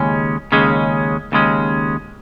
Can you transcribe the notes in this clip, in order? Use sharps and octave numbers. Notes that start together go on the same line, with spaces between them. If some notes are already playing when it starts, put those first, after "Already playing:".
Already playing: D#2 C#3 G#3 C#4
D#2 C#3 G#3 C#4
D#2 C#3 G#3 C#4